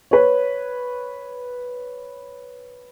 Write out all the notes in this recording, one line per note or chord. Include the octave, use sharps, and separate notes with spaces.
B4 C#5